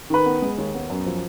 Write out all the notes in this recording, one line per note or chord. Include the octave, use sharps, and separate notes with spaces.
D#3 B4 B5
B3
G#3
D#2
B3
F#2
F3